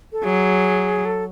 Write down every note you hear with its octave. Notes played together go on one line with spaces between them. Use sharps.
A4
F#3 G#4
A4